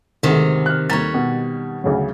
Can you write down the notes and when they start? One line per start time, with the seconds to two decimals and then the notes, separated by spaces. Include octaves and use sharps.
0.23 D2 G#2 C3 D#3
0.66 F6 F#6
0.90 D#2 G3 C#5 A#5 A6
1.14 B2
1.84 D2 C#3 F#3